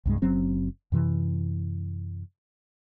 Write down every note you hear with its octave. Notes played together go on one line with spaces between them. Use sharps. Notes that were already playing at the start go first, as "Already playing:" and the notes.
C2 G2 G#3
F#1 F#3 C4 C#4
F#2 C3 E3